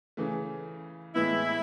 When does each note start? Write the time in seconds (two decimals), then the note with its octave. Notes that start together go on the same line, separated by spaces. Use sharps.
0.17 C#3 E3 A3
1.15 A2 E3 G#3 B3 E4